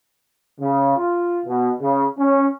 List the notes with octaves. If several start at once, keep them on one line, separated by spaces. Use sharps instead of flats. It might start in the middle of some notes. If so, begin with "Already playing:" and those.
C#3
F4
B2
C#3
C#4